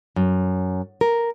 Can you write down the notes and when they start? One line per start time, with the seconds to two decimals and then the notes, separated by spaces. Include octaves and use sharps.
0.16 F#2
1.01 A#4